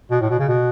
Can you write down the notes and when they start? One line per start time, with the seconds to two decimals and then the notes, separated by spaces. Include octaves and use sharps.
0.11 B2
0.21 A2
0.30 B2
0.39 C#3
0.48 B2